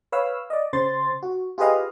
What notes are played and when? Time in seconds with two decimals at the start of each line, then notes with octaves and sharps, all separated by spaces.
0.12 B4 C#5 F5 E6
0.50 D5 D#5
0.73 C#3 C5 C6 A6
1.23 F#4
1.58 F4 G4 G#4 B4 D#5 F5